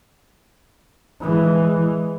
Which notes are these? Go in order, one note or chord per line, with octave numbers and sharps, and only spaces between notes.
E3 G#3